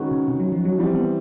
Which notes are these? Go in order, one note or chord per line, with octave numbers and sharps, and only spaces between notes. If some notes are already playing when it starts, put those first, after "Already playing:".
Already playing: D#3 G#3 C#4 F#4 B4
C#3
C3
F#3
F3
F#3
E3 F3 G3 C4
B3